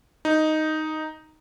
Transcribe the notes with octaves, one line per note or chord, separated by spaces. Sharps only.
D#4